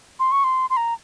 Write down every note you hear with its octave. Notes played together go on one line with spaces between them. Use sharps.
C6
C#6
C6
C6
A#5